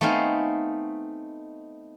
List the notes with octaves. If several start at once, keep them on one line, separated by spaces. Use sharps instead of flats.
A3 B3 C4 D#4 F5 G#5